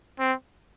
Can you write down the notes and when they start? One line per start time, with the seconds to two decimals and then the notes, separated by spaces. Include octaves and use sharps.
0.19 C4